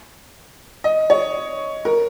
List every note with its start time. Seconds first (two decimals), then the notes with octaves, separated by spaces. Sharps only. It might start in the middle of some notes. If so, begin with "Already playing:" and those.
0.84 D#5
1.10 C#5
1.85 A#4